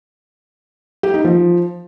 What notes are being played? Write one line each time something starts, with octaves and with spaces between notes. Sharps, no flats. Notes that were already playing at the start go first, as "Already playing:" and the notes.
G4
D#4
F3